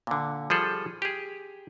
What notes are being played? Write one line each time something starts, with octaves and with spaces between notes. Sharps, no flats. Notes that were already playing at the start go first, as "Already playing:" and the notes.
A#2 D3
F3 G3 G#4 A4
G4 G#4